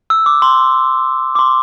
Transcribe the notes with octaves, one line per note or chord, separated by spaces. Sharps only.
E6
D6
C6
D6
C6